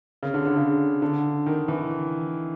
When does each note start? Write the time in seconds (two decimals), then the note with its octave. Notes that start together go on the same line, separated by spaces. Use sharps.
0.23 C#3
0.34 D3
0.45 D3
0.57 C#3
1.02 D3
1.46 D#3
1.68 E3